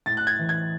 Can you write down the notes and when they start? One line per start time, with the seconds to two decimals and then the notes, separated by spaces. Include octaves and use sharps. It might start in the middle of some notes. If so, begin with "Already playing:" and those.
0.06 A2 A6
0.17 F#6
0.27 G#6
0.39 E3
0.49 G#6